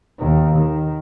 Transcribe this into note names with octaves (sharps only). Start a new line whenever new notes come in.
D#2 D#3
D#3